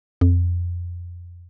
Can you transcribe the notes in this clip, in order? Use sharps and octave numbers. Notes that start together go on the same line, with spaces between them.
F2